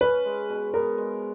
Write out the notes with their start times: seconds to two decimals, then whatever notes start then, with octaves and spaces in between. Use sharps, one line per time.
0.01 C#4 B4
0.25 G#3
0.50 B2
0.74 B3 A#4
0.98 G#3